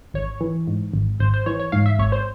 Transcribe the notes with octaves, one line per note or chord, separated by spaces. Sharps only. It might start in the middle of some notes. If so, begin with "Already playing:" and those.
G#1 C#5
E3
G#2
G#1
G#1 C5
C5
E3 C#5
C#5
G#2 F5
E5
G#1 C#5
C5